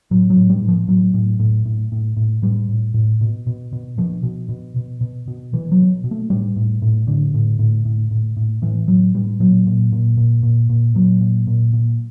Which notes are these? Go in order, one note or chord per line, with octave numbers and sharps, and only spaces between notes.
A2 F#3
F#3
A2
G3
A2
F3
A2 F#3
A2
A2
A2
A2
A2
A2 G3
A2
A2
B2
B2
B2
B2 F3
B2
B2
B2
B2
B2
B2 E3
F#3
B2
B2
A3
A2 G3
A2
A2
A2 D3
A2
A2
A2
A2
A2
A2 E3
A2 F#3
A2 G3
A#2 F#3
A#2
A#2
A#2
A#2
A#2
A#2 F#3
A#2
A#2
A#2